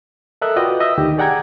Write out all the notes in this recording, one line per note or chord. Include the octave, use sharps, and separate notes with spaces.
A4 A#4 D#5 E5 E6 F#6
F4 F#4 B4 D5 D#5 G5
D#5 E5 E6
D2 D#3 G4
G#4 D5 F#5 G5 A#5 G#6